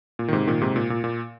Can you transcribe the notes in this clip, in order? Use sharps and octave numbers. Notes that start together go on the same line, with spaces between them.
A#2
D#3
G#2 C3
A#2 D#3
G#2 C3
A#2
A#2
A#2